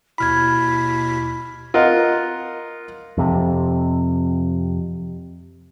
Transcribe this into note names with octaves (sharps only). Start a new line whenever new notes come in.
D#2 B2 E4 B5 F6 G#6 B6
F4 A#4 D#5 F#5
F2 C3